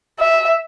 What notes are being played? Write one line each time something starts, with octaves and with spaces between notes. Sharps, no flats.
E5